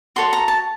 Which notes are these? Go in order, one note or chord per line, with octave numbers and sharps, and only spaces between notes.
F#4 A4 C#5 C6
A#5
A5